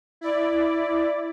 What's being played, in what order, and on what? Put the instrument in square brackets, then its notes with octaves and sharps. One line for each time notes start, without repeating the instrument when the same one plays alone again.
[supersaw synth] E4 D5